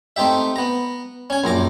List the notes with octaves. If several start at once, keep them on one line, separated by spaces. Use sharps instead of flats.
A3 C4 D#4 G4 E5
B3 A#5
C#4 G#5
A#1 F#2 A#5 D6